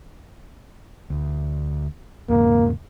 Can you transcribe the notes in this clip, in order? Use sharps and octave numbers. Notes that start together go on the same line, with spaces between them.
D2
E2 G#2 C#3 A#3